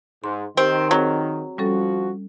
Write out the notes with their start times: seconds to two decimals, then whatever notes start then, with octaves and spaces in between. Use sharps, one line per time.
0.24 G#2 C6
0.57 D#3 C4 G4
0.91 F#3 C4 G#4 C5
1.58 F3 G3 C#4 F#4 A4